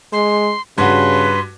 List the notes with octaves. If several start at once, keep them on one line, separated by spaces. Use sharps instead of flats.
G#3 C6
G2 C#3 F#4 B4 C6